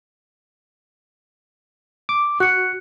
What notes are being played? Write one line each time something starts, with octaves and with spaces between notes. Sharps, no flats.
D6
F#4 F#6 C#7